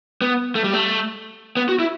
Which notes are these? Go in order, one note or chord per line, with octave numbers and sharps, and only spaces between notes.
B3
A3
G3
A3
B3
F#4
E4